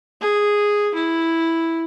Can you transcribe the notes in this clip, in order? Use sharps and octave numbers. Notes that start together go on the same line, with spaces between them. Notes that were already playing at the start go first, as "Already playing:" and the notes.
G#4
E4